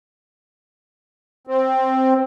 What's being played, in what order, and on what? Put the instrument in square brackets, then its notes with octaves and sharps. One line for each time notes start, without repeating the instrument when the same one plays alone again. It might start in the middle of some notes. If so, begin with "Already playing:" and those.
[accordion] C4